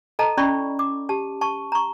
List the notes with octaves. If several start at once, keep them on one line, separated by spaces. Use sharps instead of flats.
A4 D#5 A5 A#5
C#4 E4 D5 B5 C#6
D6
G4 A5
A5 C#6
A#5 C#6